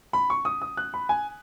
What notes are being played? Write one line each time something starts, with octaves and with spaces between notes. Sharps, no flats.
B5
C#6
D#6
D#6
F#6
B5
G#5